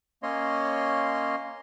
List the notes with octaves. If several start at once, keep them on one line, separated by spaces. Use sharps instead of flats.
A#3 C#4 C#5 D#5 C6